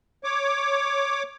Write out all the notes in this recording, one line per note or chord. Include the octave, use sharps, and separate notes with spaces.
C#5 D6